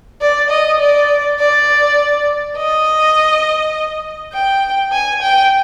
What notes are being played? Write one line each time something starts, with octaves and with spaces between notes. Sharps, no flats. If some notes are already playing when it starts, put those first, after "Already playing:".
D5
D#5
D5
D5
D#5
G5
G#5
G5